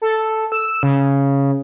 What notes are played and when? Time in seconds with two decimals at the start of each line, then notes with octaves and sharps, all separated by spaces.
0.02 A4
0.52 E6
0.83 C#3